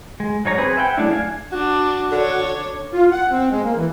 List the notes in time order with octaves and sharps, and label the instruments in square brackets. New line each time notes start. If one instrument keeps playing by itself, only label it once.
[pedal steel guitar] G#3
F#3 D#4 C#5 A#5
C4 G#4 B4 C5
E5 F#5 G5
F#3 G#3 A3 D4 E4
D4 F5 G#5
[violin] D4 [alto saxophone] F#4
[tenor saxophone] D3 [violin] D4 C#5
[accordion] F4
F#5
C4
G#3
A#3
E3